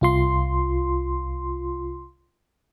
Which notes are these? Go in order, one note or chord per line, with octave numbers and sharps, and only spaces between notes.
C2 F4 C6